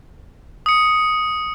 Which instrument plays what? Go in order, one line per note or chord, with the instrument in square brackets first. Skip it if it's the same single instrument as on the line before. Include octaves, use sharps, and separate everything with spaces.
[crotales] D#6 C#7